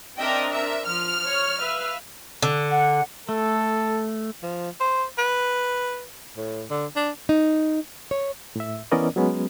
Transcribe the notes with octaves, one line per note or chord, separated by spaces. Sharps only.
C4 D4 A#4 D#5 E5 G5
E5
F3 F6
C#5
B4 E5 F5
D3
F#5
A3 A4
F3
C5
B4
A2
D3
D4
D#4
C#5
A2 E5
E3 B3 C#4 A#4 D5 D#5
F#3 G#3 B3 C#4